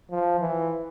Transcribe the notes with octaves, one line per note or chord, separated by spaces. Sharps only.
F3
E3